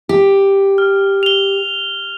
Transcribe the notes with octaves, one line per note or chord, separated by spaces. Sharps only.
G4
F6
F7 G7